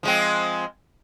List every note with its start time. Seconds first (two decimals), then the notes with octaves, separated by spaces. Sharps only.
0.03 F3 G#3 C4